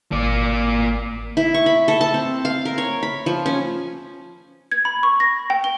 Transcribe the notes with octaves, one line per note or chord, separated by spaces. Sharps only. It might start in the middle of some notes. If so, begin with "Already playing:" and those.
G#1 A#3 D5
E4
C#6
B5
A4
A5
C4
F5
A#4
C#5
B5
F3
C#4
G#6
B5
C#6
A#6
G5
G7